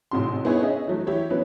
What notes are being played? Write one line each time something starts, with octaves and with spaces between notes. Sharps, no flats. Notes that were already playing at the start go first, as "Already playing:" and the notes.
A1 G#2 C3 F#4 C6
B3 D#4 E4 G#4 B4 C#5
C#4 G#4 D#5 E5
E3 F#3 A3
E3 E4 G4 C#5
E3 F#3 B3 C#4 B4